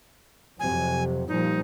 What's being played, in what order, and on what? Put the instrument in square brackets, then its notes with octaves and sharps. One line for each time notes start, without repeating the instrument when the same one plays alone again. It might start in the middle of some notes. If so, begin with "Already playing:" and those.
[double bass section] F2 C3 F#3 [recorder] G#5
[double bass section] A#2 F3 G3 [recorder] D#4